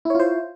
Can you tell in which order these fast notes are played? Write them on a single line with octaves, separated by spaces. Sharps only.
E4 C#5 F4 C5